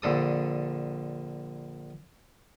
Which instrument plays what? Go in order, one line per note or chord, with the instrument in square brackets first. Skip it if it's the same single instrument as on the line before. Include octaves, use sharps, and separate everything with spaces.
[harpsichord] A#1 D3 A4 D#6